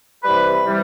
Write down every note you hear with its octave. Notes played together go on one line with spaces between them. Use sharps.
C3 E3 G3 B4
C3 E3 G3